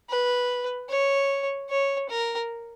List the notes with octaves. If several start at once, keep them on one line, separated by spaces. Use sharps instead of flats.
B4
C#5
C#5
A#4